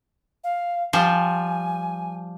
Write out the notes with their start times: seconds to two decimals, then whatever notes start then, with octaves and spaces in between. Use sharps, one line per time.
0.44 F5
0.93 F3 G3 G#5